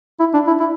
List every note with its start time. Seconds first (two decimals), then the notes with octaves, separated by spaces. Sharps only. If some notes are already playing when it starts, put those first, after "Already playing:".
0.20 E4
0.34 D4
0.47 E4
0.60 E4